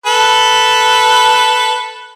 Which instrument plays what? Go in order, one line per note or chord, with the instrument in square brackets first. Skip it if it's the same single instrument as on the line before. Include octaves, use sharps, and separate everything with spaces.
[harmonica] A4 B4